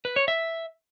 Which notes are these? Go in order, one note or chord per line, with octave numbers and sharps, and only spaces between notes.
B4
C#5
E5